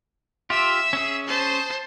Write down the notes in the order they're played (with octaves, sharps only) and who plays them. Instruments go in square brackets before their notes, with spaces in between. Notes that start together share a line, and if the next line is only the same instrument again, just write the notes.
[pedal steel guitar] F4 G4 [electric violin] E5 E6
[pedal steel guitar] C#4 G#4
[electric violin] C5 A5